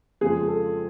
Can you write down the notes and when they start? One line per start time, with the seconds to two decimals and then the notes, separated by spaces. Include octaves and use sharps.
0.21 F2 C#3 F3 G#3 G#4
0.48 A4